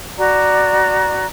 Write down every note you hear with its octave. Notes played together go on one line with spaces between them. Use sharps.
F#4 D5 A#5